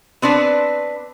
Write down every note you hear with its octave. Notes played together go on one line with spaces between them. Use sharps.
B3 C4 D4 B4